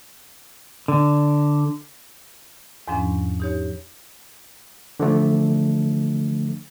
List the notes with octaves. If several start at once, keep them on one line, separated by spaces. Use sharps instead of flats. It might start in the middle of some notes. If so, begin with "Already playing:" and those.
D3
E2 G#2 F3 C#4 D4
D#4 G4 C#5
D3 F3 A3